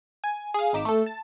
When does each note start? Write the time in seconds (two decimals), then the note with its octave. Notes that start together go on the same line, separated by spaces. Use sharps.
0.24 G#5
0.54 G#4 F5
0.73 G#1 D#4 D6 B6 E7
0.85 A3 A4
1.06 A5